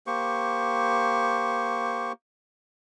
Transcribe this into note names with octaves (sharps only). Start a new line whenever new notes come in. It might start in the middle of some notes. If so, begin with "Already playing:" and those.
A#3 G4 C5 C#6